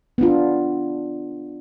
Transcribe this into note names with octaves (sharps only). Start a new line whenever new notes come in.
B3 D4 F4